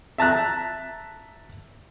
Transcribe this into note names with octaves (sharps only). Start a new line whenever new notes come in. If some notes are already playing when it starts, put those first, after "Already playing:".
E5 A5 A#5 F#6